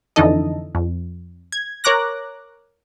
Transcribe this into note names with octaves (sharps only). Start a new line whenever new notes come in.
F2 D3 E3 D#4 A4 D#5
F2
G#6
A#4 C#5 A#5 D6 F#6 A#6